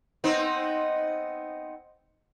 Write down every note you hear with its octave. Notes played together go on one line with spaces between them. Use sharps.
B3 C4 D#4